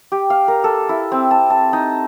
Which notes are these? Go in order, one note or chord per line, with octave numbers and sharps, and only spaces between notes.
G4
F5
A#4
A4
E4
C4
A5
A5
D#4